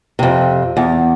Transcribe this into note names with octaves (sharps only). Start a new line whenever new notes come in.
F2 C3
E2